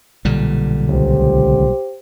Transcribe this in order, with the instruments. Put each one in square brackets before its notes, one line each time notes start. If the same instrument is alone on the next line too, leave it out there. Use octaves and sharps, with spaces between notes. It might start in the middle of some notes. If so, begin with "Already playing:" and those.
[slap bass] B1 A#2 G3 [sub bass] D3
[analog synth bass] C#2 [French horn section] G4 C5